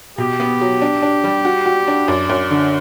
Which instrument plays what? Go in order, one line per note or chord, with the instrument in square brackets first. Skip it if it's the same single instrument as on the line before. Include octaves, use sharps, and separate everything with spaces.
[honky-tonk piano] B2 [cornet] G4
[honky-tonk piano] B3
F#3
D4
D4
G3
F#4
F#4
D4
[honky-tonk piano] F#2 [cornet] D5
[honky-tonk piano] F#2
D3